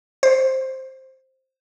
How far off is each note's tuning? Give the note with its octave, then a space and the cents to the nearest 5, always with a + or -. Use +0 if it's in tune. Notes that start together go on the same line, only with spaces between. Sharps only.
C5 +5